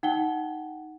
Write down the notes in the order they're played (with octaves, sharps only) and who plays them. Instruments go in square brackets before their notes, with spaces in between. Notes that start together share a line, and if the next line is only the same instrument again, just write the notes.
[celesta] D#4 F#5 G5 G7